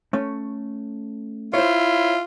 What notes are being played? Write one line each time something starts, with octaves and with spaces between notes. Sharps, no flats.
A3 C#4
E4 F4 C5 C#5